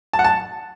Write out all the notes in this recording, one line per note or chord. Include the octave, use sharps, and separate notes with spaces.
A5
F#5
A5